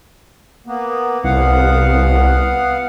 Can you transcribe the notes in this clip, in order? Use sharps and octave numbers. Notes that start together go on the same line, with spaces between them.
A#3 B3
C2 B3 F5 F#5